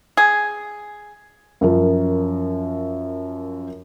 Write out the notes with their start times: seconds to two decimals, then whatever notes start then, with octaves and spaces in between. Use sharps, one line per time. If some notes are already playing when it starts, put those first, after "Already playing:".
0.17 G#4
1.61 F#2 F3 A#4